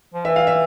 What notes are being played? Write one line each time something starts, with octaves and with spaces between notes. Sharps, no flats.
F3
E3 E5
F5
E5